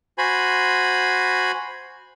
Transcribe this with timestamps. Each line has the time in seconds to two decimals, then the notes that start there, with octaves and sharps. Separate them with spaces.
0.18 F#4 C5 G#5 B5